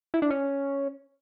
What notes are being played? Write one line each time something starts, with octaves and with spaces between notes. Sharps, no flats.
E4
D4
C#4